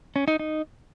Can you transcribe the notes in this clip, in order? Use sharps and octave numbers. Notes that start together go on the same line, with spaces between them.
C#4
D#4
D#4